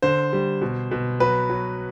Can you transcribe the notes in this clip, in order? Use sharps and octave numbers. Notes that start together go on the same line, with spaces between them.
D3 C5
G3
B2
B2
F#3 B4
F#3